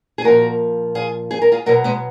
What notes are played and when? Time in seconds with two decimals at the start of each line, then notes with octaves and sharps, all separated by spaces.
0.18 G#4
0.24 A#2 F3 F#4 A#4
0.95 F4 G#4
1.31 G#4
1.42 A#4
1.52 F4 G#4
1.66 B2 F#3 F#4 A#4
1.84 G#3 B3